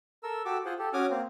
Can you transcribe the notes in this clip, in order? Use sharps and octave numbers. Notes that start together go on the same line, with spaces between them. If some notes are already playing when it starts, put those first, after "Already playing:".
A4 A#4 E6
F#4 G4 A4 D6 E6
F4 G#4 C5 F#5
G4 A4
C#4 F#4 G#5 D6 D#6 F6
A#3 C4